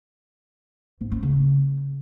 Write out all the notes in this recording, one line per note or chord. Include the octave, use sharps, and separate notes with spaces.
G#2
C#4
C#3